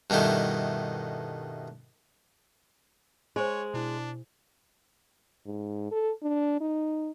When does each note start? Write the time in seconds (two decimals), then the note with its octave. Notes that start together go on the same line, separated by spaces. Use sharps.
0.10 G2 B2 D#3 A3 E4
3.36 G#3 C5 C#5 G#5 C6
3.74 B2 D4 E4
5.46 G#2
5.91 A4
6.23 D4
6.61 D#4